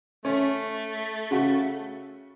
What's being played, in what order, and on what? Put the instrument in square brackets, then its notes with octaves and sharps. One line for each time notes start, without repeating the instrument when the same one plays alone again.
[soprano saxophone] A3 [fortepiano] C#4
[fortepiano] C#3 F#4